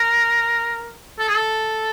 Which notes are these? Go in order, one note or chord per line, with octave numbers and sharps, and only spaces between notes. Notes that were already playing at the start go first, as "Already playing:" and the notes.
Already playing: A#4
A4
G#4
A4